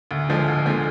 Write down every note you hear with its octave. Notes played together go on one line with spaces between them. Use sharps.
D2
D3 F3 G#3
D2
D3 F3 G#3